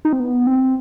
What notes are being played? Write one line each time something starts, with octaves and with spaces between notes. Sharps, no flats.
D#4
C4
B3
C4